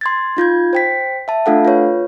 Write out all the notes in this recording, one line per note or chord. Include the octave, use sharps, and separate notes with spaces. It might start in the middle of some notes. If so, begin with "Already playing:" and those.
C6 G#6 A6
D#4 F4 G6 G#6
C5 G5 B6
E5 A5
A3 D4 F4 A4 F5 F#5
F4 B4 C#5